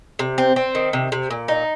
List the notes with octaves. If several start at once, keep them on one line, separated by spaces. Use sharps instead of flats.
C3
C4
C4
D#3
C3
C3
A#2
D#4